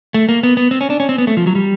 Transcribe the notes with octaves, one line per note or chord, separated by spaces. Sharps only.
A3
A#3
B3
B3
C4
C#4
D4
C#4
C4
B3
A3
F3
F#3
G3